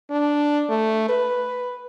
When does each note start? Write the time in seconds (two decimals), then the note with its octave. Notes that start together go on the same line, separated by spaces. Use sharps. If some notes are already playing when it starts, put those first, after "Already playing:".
0.10 D4
0.69 A3
1.09 B4